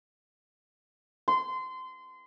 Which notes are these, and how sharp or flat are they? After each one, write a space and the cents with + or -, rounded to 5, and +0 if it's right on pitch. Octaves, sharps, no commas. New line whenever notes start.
C6 -25